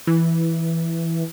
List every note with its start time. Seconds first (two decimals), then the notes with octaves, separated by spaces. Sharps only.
0.07 E3